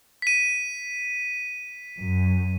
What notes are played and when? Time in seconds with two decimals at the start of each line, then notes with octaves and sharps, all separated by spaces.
0.22 B6 D#7
1.96 F#2